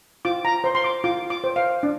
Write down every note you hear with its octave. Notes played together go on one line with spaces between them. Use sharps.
F4 D6
A#5
C5 C6
C6
D6
F4 D6
D6
C5
F5
D4